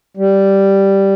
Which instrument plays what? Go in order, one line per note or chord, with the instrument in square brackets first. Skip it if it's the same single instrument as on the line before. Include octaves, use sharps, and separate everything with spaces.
[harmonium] G3